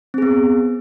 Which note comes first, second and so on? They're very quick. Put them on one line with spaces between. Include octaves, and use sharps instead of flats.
C4 G#4 B3